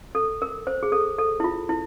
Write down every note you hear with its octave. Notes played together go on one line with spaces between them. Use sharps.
A4
A#4
C5
G#4
A4
A4
E4
F4
E4